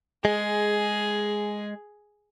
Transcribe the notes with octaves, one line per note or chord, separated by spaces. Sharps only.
G#3 G#4